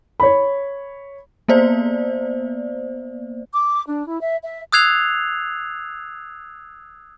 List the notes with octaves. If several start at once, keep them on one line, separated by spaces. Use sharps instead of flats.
C#5 B5
A#3 B3 C5 D5
D6
D4
E4
E5
E5
D#6 E6 F#6 G#6 C7 F7